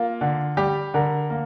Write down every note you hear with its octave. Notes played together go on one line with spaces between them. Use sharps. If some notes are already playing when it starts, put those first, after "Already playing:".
Already playing: A#3 F4
D3
G3 G4
D3 A#4
A#3